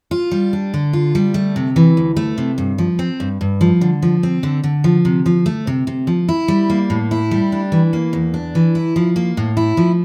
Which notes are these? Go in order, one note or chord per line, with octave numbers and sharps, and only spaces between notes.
F4
G3
D4
D3
F4
G3
A3
C3
E3
D2
A3
C3
G2
F3
C4
G2
G2
F3
D3
F3
C4
D3
D3
F3
C3
F3
A3
C3
C3
F3
E4
G3
A#3
A2
E4
G3
D4
E3
A#3
E2
D4
E3
E4
F3
A#3
A2
E4
F3